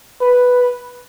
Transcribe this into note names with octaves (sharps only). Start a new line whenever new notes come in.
B4